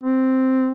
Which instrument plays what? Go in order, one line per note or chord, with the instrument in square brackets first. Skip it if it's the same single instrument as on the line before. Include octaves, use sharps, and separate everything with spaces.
[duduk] C4